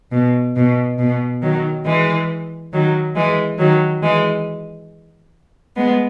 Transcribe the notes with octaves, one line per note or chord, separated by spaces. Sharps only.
B2
B2
B2
D#3 F#3
E3 G#3
D#3 F#3
E3 G#3
D#3 F#3
E3 G#3
G#3 B3